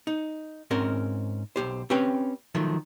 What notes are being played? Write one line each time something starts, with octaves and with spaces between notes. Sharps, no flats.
D#4
G#2 C4 C#4 A#4
B1 G4 C5
C4 C#4 G4 B4 C#5 G5
D#3 F3 F#3 A3